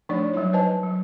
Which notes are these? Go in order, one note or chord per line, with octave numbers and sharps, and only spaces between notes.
F3 A3 D4 D#4 C#5 D5
F#3 G3 D#4 E4 C#5
B4 C5 D#5 G#5 A5
F#3